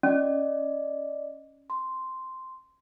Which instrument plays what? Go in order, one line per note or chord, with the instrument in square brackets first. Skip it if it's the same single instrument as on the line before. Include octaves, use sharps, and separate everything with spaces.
[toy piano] C#4 [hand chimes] D5 D#5
[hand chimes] C6